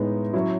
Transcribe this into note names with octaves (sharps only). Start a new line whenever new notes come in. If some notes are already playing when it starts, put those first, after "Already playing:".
Already playing: A2 G#3 B3 D#4
F#3 C#4 E4